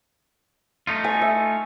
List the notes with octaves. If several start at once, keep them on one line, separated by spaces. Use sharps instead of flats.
A3 D#4 F4
G#5
E5